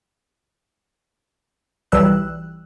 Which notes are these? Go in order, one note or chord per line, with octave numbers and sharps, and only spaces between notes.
B1 E3 G3 E6 F#6